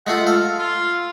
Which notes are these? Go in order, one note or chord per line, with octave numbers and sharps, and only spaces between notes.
G#3 A3 F4 F#5
A4 F5
F4